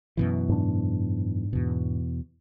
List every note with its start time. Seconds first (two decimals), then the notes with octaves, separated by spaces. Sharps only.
0.17 F#2 B2 E3
0.49 G#2 D4
1.53 E2 B2